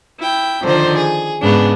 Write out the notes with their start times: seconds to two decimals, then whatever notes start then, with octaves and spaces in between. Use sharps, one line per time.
0.20 E4 G5
0.63 D3 D#3 F3 C5 D5
0.97 G#4
1.42 G#2 C#3 B3 D4